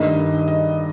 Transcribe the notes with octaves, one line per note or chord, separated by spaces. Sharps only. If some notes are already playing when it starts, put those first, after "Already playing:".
Already playing: G2 D#3 A3 D#5
D#5